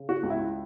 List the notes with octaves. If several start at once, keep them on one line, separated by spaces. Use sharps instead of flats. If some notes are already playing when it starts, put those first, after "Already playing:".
Already playing: C#3
F#4
C#2
E4